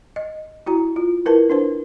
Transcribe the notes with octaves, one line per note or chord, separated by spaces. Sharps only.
D#5
E4 F#4 A#5
F4
E4 A#4 B4 A5
D4 B4 C5